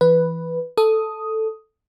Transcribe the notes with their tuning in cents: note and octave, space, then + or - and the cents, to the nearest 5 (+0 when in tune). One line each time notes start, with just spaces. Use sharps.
E3 +10 B4 +0
A4 +0 D#6 +5